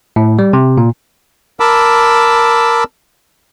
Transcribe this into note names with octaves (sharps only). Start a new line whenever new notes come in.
A2
G3
C3
A#2
A#4 A5 B5 D6 E6